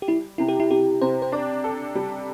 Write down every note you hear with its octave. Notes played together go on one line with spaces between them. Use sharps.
G4
G3 E4
C3 E4
G4
E4
C3 G4
C3 C5
C5
D4 D5
A4
G3